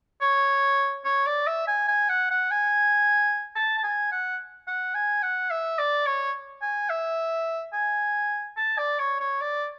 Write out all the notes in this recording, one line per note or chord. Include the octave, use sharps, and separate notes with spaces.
C#5
C#5
D5
E5
G#5
G#5
F#5
F#5
G#5
A5
A5
G#5
F#5
F#5
G#5
F#5
E5
D5
C#5
G#5
E5
G#5
A5
D5
C#5
C#5
D5